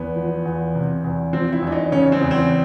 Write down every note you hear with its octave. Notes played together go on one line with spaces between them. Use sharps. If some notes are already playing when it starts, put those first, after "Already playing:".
Already playing: E2 B3
F3
E2
C3
E2
F3 C4
E4
E2 D4
D#4
C#3 C#4
C4
E2
C4